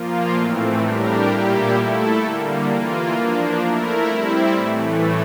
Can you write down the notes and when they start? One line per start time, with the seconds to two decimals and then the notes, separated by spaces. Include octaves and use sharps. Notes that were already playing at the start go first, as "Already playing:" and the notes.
Already playing: A#2 F3 A#3 F4
0.33 A2 E3 A3 C4
0.80 A2 G3 D4 G4 A#4
1.26 A#2 G3 A#3 E4 G4
1.73 A3 E4 A4
2.20 D3 G3 A#3
2.66 E3 A#3 F4
3.12 F3 A#3 D4
3.59 A3 E4 A#4
4.06 G3 C4 E4
4.53 A2 E3 A3